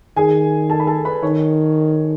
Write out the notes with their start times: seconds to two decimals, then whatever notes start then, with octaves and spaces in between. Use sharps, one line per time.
0.17 D#3 G#4 G#5
0.70 A4 A5
0.80 B5
0.87 A4 A5
1.04 B4 B5
1.22 D#3 C#5 C#6